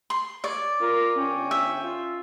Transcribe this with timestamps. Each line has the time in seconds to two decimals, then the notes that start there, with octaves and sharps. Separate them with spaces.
0.10 C6
0.44 C#5 D5
0.81 F4 A#4
1.18 G1 C#4 G5
1.51 E5
1.83 F4